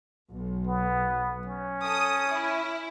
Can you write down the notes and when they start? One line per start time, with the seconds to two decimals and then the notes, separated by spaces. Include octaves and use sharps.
0.30 B1
0.67 B3
1.47 C#4
1.82 A4 D#6
2.29 E4